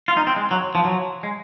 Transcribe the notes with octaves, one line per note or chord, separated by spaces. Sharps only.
F4
D#4
C4
G#3
F#3
F3
F#3
G#3